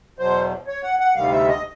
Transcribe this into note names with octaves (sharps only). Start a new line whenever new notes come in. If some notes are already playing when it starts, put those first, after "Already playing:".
E2 B2 F#3 C5
C#5
F#5
F#5
D2 C3 D#3 G3 F5
E5
D#5